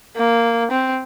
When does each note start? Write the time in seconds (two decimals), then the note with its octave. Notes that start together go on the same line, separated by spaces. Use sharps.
0.17 A#3
0.71 C4